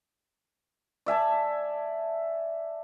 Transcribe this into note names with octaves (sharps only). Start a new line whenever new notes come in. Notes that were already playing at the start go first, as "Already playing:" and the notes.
D5 E5 G#5 A5